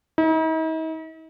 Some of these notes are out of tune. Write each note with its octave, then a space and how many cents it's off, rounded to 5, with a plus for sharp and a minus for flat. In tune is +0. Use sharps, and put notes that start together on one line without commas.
D#4 +45